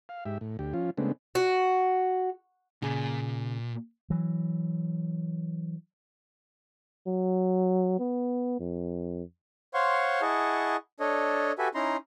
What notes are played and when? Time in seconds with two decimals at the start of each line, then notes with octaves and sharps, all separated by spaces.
0.09 F5
0.26 G#2 G4 E5
0.41 A2
0.59 D2 G4
0.74 F3 C#4 F4
0.97 C#3 G#3 A3 B3 C4 D4
1.35 F#4
2.82 A#2 C#3 G#4
4.10 E3 F#3
7.07 F#3
8.00 B3
8.60 F2
9.74 C5 C#5 F5 F#5 C6 C#6
10.22 E4 G#4 D#5 F#5 A5 C#6
11.00 D4 A4 C#5 D#5
11.59 F#4 G4 A4 B4 E5 G#5
11.75 C#4 D#4 E4 A#5 C6